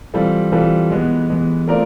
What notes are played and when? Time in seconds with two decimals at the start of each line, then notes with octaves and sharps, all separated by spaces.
0.14 E3 G3 C4 F4 A4
0.52 E3 G3 C4 F4 A4
0.90 E3 G#3 B3
1.28 E3 G#3 B3
1.67 A3 C4 F4 A#4 D5